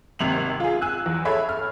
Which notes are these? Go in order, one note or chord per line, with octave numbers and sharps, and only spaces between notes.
G#1 C3 F7 F#7
F4 G#4
G#5 E6 F#6
E2
G#4 A4 C#5 E5 B5
F6